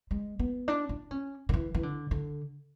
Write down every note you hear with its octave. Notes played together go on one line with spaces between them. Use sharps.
G#3
B3
D4
D4
C#4
D3
E3
E3
D3
D3